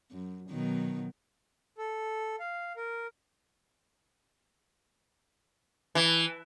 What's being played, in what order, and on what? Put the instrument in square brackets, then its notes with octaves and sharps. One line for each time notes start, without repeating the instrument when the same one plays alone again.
[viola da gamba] F#2
B2 D#3 F#3
[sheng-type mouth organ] A4
F5
A#4
[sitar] E3